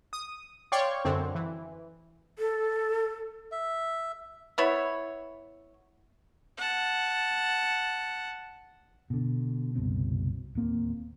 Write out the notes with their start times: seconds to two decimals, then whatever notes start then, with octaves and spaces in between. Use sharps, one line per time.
0.13 D#6
0.72 C#5 D5 F5 G5 C6 C#6
1.05 F#2 D3 C4
1.35 E3
2.39 A4
3.52 E5
4.58 B3 E4 C#5
6.57 F#5 A5
9.10 B2 D3
9.75 F#1 C2 B2 C4
10.55 D1 D#2 A#3 C4